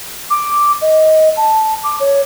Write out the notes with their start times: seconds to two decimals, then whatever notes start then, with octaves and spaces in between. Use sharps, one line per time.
0.30 D6
0.82 D#5
1.37 A5
1.84 D6
2.00 C#5